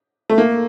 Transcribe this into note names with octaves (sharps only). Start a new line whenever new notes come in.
A3
A#3